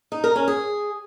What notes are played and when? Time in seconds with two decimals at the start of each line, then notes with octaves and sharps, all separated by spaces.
0.12 D#4
0.24 A#4
0.36 C#4
0.48 G#4